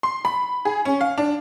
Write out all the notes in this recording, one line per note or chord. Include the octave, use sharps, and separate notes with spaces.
C6
B5
G#4
C#4
F5
D4